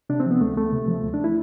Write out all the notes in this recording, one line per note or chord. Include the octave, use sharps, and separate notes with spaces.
C3 D4
C4
F3
B3
D2 A3
D2 A3
C3
F3
D2
D4
E4